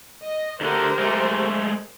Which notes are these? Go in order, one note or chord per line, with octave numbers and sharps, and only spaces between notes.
D#5
D2 D3 G4 A#4 C5
G#3 A3